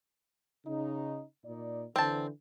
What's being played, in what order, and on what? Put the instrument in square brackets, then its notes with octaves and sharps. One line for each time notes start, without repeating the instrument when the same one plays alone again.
[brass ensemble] C#3 D#4
A#2 D#4 D5
[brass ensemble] D3 E3 [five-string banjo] C4 A5